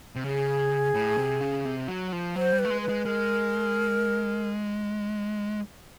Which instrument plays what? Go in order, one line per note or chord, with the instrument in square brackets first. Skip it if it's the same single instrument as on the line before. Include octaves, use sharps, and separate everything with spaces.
[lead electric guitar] C3
[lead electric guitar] C#3 [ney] G#4
[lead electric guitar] A2
C3
C#3
C3
F#3
F3
[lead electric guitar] F#3 [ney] C5
[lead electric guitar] G3
[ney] B4
[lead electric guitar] A3
G#3
[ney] B4
[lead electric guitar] G#3
[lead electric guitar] G#3 [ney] A#4